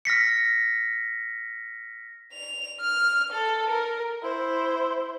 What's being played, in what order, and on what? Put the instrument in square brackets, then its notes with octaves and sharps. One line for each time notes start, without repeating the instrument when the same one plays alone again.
[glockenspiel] F6 A#6 B6 C#7
[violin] F7
F6
A4
A#4
[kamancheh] E4 C5